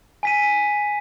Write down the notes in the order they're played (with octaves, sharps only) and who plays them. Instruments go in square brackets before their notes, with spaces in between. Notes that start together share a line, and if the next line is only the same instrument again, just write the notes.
[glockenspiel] G#5 B6 D#7